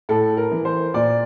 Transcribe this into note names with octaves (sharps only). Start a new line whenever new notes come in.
A2 A4
A#4
E3
C5
A#2 D5